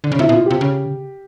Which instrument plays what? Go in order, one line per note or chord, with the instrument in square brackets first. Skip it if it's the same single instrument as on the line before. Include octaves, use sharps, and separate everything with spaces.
[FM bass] D3
C#3
[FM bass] C3 [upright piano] E4
[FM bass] B2
[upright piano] F4
[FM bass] C3 [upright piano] G4
[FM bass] C#3